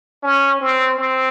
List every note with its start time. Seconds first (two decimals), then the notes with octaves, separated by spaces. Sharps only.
0.23 C#4
0.61 C4
0.99 C4